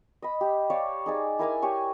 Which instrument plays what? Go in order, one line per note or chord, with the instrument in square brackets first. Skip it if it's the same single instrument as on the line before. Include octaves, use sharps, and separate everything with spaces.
[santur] D#5 B5
G4
C#5 D5 F5 A5
D#4 G#4 D5
E4 A#4 G#5 D6
G4 C#5 G#5